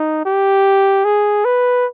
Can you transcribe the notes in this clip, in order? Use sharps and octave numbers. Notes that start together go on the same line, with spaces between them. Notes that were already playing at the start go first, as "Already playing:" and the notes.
Already playing: D#4
G4
G#4
B4